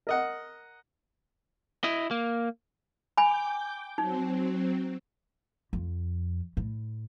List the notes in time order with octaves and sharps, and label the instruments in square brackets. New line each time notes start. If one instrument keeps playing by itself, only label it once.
[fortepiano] A#4 D#5 F#5
[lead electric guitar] E4 D#5
A#3
[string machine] G5 D6 G6 [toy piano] G#5 B5
[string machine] F#3 C4 [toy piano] D#4
[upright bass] F2
A2